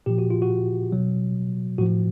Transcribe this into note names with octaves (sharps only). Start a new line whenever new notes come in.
A#2 F3 G4
F#4
F4
F#4
B2 F#3
A2 F3 F#4